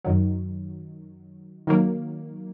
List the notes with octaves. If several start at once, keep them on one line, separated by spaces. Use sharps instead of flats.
F#2 D#3 F#3
D#3 F#3 A#3